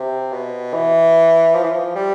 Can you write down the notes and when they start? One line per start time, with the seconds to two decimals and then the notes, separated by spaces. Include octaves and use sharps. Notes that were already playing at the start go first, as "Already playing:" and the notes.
Already playing: C3
0.32 B2
0.73 E3
1.55 F3
1.63 E3
1.71 F3
1.95 G3